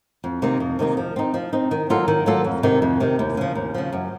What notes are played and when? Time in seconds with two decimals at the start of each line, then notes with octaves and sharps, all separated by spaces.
0.24 F2
0.42 C3 D#3 A#3 D#4
0.60 F2
0.79 C3 D#3 A#3 D#4
0.97 F3
1.16 C4 D#4
1.34 F3
1.53 C4 D#4
1.71 D#3
1.90 F#3 A#3 F4 A4
2.08 D#3
2.26 F#3 A#3 F4 A4
2.44 F2
2.63 C3 D#3
2.82 F2
3.00 C3 D#3
3.19 D#2
3.37 C#3 F3
3.55 D#2
3.75 C#3 F3
3.93 F#2